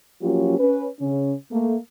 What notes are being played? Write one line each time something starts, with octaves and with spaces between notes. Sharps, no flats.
F3 F#3 A#3 C#4 F4 G4
C#4 B4
C#3 C#4
A3 A#3